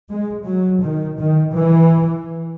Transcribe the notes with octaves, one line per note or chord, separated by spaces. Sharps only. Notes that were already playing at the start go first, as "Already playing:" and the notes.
G#3
F#3
D#3
D#3
E3